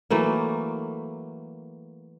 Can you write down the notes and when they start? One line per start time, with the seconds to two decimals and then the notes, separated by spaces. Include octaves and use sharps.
0.11 E3 F#3 A3 A#3